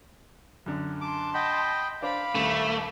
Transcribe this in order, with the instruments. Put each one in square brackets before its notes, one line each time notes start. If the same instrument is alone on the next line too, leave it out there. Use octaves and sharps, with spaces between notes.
[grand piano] F#2 D3
[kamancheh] A5 C6 [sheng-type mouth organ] D6
[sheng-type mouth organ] D#5 G5 B5 [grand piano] F#5
[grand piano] D4 C5 [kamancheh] F5 B5 [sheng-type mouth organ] D6
[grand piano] D#1 [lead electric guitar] A3